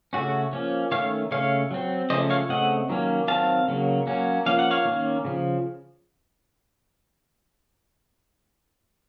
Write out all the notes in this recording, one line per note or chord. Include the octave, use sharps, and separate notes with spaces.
C#3 A3 C#4 F#4
F3 A#3 C#4
D#3 A3 C#4 C#5 F5
C#3 A3 C#4 C#5 F5
F#3 C4
C#3 F3 A3 C#4 C5 D#5
C#5 F5
C#3 A3 C4 D#5 F#5
D#3 F#3 A#3 C#4
D#3 F#3 C4 F5 A5
C#3 F#3 A#3
F#3 A#3 C#4
F3 A#3 C#4 F5
F#5
C#5 F5
D#3 A#3 C#4
C#3 F3